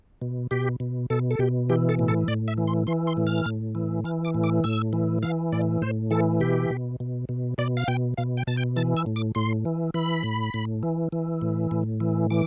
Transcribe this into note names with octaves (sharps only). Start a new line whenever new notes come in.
B2
B2 G4
B2
B2 A4
A4
B2 G4
E3 G4
A4
A2
A4
A2 D5
E5
E3
C6
E3 C6
C6
A2
F6
A2
E3
E3 F6
D6
A2
D6
A2 E6
E3
E3 F5
A2 D5
A2 C5
E3 A4
B2 G4
B2
B2
B2
B2 D5
F5
B2 G5
B2 F5
G5
B2 A5
G5
E3 A5
E6
A2
D6
A2 C6
E3
E3 B5
A2
A2
E3
E3
A2
A2
E3
E3 D6